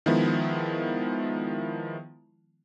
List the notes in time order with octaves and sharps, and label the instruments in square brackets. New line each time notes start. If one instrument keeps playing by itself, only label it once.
[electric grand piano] D#3 F3 G#3 B3 E4